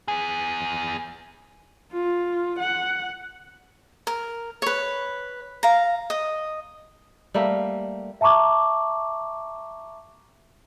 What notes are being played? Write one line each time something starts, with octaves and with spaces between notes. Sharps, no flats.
B3 G#4
F4
F#5
A#4
B4 C#5
F5 A#5
D#5
G3 A3 A#3
E5 A5 A#5 C#6 D6